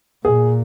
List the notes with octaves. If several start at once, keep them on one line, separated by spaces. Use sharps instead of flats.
A#2 G#4